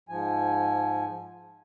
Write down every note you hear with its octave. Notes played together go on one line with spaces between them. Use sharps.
G#2 F3 G#5